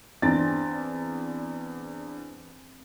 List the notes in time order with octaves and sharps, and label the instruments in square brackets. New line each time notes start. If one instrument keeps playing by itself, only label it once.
[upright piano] E2 D4 A6 [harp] C4